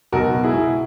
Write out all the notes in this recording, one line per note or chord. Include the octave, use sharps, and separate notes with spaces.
B1 F#4 A#4
B2
E4 G#4
B2